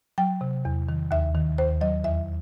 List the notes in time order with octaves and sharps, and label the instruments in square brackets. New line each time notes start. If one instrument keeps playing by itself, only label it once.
[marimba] F#3 G5
C3
E2
D#3
D#2 E5
D#3
D#2 C5
F#3 D#5
E2 E5